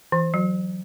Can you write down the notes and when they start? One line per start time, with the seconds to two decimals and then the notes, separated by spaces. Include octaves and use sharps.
0.12 E3
0.34 F#3